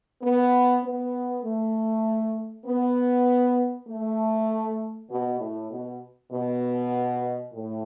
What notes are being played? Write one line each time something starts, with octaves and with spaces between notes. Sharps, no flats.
B3
B3
A3
B3
A3
B2
A2
B2
B2
A2